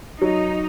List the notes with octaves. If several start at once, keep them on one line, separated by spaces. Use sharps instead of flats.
F#3 D#4